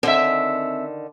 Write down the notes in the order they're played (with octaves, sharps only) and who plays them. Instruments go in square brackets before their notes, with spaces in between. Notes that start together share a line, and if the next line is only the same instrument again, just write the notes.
[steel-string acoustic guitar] D3 D#3 [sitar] C4 E5